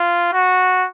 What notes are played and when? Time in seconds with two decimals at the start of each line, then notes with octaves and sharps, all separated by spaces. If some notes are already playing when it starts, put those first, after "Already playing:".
Already playing: F4
0.32 F#4